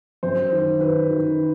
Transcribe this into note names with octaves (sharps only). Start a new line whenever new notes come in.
F#2 C5
D#3
D#3 B4
D#3